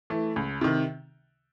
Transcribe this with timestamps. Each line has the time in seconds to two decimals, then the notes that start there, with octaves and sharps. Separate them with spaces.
0.10 E3 A3
0.36 C#2
0.61 C3 D#3